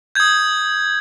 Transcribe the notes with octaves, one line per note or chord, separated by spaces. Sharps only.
D#6 G6 G#6